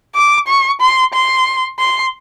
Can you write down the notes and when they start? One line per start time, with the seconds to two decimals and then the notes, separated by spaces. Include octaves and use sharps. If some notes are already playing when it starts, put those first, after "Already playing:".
0.15 D6
0.48 C#6
0.81 C6
1.14 C6
1.79 C6